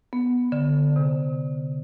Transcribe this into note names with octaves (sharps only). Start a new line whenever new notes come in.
B3
D3
C3